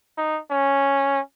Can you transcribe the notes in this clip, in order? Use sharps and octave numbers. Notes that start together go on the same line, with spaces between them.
D#4
C#4